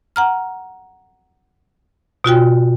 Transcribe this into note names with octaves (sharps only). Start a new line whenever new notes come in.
F#5 A#5 F6
B2 F4 F#4 G5